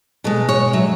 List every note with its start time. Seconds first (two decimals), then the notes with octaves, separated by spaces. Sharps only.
0.24 B2 G#3 A4
0.49 C#5
0.73 D3 F#3 E5